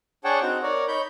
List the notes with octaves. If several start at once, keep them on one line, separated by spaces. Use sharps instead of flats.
D4 G#4 C#5 F#5 G5 A5
C4 D#4 F#4
A#4 C#5 D5
D#4 C#5 B5 G6